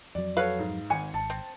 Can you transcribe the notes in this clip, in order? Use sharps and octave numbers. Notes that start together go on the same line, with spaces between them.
F2 F#3 D5
F#4 A4 B4 C#5 F5
G#2
G#1 G#5 C#7
G#1 A5
C4